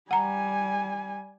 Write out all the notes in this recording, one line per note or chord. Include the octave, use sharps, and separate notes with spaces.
G3 F#5 G#5 A#5